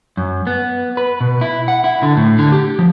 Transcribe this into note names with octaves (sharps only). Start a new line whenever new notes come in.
F#2
B3
B4
B2
E4
F#5
E4
D3
A2
D3
G4
F3